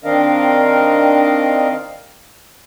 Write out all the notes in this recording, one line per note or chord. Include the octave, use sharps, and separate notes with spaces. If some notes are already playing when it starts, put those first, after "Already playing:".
D#3 C4 D4 A#4 D#5 F5